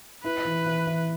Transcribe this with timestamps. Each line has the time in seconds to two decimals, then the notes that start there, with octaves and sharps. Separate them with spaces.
0.23 E4 B4
0.45 E3
0.66 E3
0.87 E3